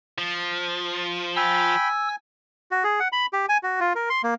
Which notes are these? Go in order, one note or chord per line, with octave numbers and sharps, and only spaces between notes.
F3
G5 G#5 B5 E6
F#4
G#4
F#5
B5
G4
G#5
F#4
F4
A#4
C6
A#3